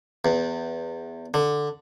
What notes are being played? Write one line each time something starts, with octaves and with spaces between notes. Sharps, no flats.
E2
D3